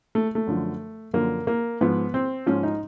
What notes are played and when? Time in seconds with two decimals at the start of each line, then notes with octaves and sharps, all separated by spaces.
0.15 A3
0.35 A3
0.47 F#2 D3 F3
1.14 F#2 D3 F3 A#3
1.47 A#3
1.81 G#2 F3 B3
2.14 C4
2.46 G#2 F3 C#4
2.63 D#4